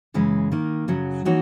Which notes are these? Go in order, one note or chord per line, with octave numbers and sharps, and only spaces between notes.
F#2 C#3 E3 G#3
D#3 A#3 D#4
F#2 C#3 F#3
E3 A#3 D#4 F#4 C#5